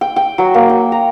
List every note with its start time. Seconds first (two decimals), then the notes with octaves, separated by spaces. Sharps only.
0.01 G5
0.16 G5
0.38 F#3
0.54 A#3
0.69 G5
0.92 A#5